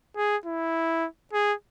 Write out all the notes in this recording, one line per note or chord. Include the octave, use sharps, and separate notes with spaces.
G#4
E4
G#4